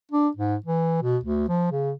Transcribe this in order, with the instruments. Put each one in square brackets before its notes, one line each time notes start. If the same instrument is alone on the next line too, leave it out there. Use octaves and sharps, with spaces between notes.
[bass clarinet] D4
G#2
E3
B2
D2
F3
C#3